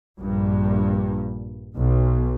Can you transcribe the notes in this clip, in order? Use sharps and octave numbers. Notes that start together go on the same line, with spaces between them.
A#1 G2
B1